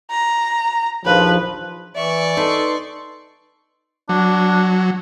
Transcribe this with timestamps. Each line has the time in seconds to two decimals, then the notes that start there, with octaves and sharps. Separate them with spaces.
0.11 A#5
1.05 A#1 D#2 F3 B4
1.95 E3 D5 E5 C#6
2.37 D#4 A4 B4 C6
4.09 F#3 D4